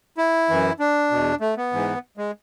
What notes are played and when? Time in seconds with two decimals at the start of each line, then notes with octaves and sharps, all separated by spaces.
0.18 E4
0.49 F#2 E3
0.80 D4
1.11 E2 B2
1.41 A3
1.57 B3
1.73 G#2 E3
2.17 G#3